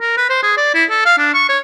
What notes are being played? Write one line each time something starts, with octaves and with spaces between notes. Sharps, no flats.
A#4
B4
C5
G#4
D5
E4
A4
F5
D4
C#6
C#5